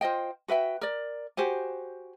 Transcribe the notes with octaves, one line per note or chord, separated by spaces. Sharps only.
F4 C5 D#5 G5
F#4 B4 E5 G5
A#4 D5
F#4 G4 C5 G#5